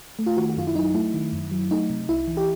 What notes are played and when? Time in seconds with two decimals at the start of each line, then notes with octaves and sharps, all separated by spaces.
0.19 A3
0.26 F4
0.37 D#3 F#4
0.50 F#4
0.57 F#2 F4
0.67 E4
0.75 F#3 D#4
0.94 A3 E4
1.14 D#3
1.33 F#2
1.51 F#3
1.71 A3 D#4
1.90 C3
2.09 C2 E4
2.28 E3
2.37 G4